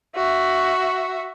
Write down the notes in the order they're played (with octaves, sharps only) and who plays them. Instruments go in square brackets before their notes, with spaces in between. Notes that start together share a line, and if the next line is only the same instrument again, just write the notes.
[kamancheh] F#4 E5